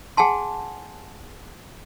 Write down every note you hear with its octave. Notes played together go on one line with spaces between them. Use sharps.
G#4 F#5 G#5 A5 C6